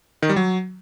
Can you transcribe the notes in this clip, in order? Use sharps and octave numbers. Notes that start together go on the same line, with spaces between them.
D#3
G3
F#3